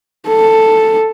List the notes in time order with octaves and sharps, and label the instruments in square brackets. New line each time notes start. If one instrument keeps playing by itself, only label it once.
[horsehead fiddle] A4